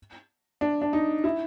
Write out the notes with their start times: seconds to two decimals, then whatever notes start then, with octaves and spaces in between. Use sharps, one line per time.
0.61 D4
0.82 D4
0.93 D#4
1.24 E4